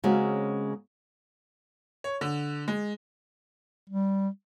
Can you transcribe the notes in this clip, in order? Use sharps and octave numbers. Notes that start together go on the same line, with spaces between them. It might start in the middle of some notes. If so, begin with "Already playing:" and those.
C#3 G#3 A#3 C4 C#4 F#4
C#5
D3
G#3
G3